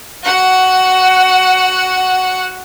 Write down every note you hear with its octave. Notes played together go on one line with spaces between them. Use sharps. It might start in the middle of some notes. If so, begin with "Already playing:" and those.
F#4 F#5